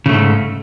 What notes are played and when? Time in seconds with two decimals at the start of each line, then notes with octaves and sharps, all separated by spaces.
0.06 C#3
0.09 A3
0.13 G#2